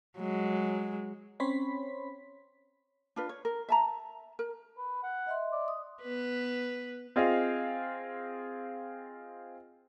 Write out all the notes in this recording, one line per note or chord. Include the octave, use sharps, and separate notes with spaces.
F#3 G#3
C4 C#4 C#5 B5 C6 B6
D4 F4 B4
C#5
A#4
E5 A5 A#5
A#4
B4
F#5
D#5 E5 C6
D5
D#6
B3 B4
C4 F4 G#4 D#5 F5